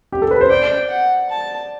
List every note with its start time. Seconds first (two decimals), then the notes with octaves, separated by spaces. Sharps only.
0.12 G4
0.22 A4
0.31 B4
0.41 C5
0.50 D5 G5
0.90 F#5
1.30 A5